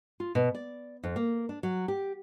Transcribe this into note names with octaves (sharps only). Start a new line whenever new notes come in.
F4
B2
D5
F2
A#3
D4
F#3
G4